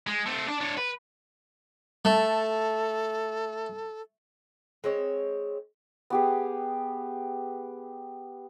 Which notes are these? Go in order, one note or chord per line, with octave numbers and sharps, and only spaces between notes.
G#3
A3 C4
D4
D4 C#5
B4
A3 A4
G#3 C4 C#5
B3 G4 G#4